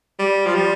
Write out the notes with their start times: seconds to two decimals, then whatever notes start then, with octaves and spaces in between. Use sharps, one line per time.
0.19 G3
0.46 F3
0.55 G3